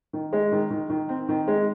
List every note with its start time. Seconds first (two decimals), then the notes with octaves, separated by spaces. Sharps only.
0.13 D#3
0.33 G#3
0.52 D#3
0.70 D#3
0.90 D#3
1.09 C4
1.29 D#3
1.48 G#3